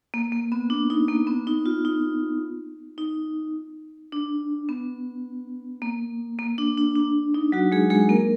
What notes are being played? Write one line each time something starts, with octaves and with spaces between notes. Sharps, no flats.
A#3
A#3
B3
D4
D#4
A#3
B3
D#4
F4
D#4
D#4
D4
B3
A#3
A#3
D4
D4
D4
D#4
F#3 F#4
G#3 G#4
G#3 G#4
A#3 A#4